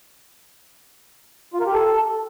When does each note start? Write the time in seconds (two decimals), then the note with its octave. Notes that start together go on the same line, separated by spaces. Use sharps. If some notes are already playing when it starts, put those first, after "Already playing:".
1.53 F4
1.60 A#4
1.66 G4
1.72 A4